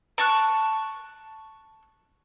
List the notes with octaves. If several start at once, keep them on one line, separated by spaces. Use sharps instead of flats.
A5 C#6 F#6